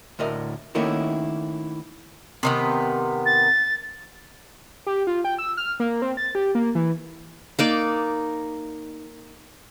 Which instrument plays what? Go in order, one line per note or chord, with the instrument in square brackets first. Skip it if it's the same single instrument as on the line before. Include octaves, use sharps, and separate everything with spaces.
[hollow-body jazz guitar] D2 A2 A#4 D#5
D#3 A3 A#3 C#4 E4 F#4
[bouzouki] C3 D#3 B3
[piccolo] A6
[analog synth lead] G4
F4
G5
E6
F6
A#3
C4
A6
G4
A#3
E3
[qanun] A#3 D#4 D5